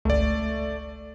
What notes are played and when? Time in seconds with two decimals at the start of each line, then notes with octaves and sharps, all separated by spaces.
0.05 G1 C#2 A3 D5